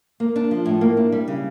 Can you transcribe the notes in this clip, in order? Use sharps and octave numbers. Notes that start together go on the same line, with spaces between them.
A#3
D4
F3
A2
A#3
D4
G3
C#3